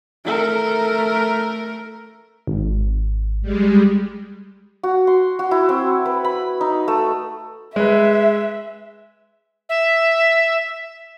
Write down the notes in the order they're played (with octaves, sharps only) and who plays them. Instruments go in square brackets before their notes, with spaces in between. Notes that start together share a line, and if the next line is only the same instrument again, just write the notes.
[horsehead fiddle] A3 A#4
[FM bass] G#1
[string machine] G3 G#3
[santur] F#4
C6
F#4
E4
C4
B4
B5
D#4
A3
[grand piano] G#3 B4 [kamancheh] E5
[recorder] E5